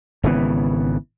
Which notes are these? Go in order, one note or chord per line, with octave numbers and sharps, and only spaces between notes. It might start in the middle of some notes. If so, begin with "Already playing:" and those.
G#1 C#3 E3 B3